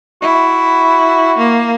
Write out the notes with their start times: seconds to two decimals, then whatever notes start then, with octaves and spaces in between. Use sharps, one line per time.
0.22 E4 F#4
1.38 A#3